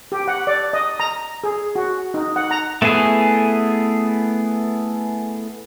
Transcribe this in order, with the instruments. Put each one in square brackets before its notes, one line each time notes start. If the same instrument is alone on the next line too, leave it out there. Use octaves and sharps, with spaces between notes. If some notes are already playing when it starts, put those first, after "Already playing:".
[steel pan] G4
F#5
D5
D#5
A#5
G#4
F#4
D#4
F#5
A#5
[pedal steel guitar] A3 B3 E4 G#4 G#5